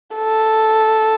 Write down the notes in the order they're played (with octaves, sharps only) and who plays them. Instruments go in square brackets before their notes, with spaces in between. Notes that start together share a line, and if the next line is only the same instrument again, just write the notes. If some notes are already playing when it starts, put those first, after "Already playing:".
[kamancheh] A4